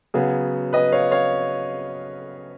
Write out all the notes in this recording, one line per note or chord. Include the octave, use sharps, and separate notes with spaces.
C#3 F#3 B3 G#4
B4 D#5
C#5 F5
C#5 F5